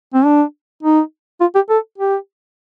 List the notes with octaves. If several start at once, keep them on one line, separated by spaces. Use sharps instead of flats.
C4
D4
D#4
F4
G4
A4
G4